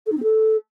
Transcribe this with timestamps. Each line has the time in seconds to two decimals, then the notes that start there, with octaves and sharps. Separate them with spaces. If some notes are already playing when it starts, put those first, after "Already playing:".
0.06 A4
0.11 D#4
0.17 C4
0.22 A4